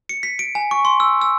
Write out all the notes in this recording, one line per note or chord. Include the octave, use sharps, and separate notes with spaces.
C#7
B6
D7
G#5
C#6
C6
E6
E6